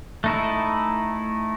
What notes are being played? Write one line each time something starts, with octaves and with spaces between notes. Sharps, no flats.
A3 D#4 E4